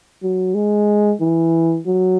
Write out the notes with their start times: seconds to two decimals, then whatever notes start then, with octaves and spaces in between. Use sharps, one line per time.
0.23 F#3
0.55 G#3
1.21 E3
1.87 F#3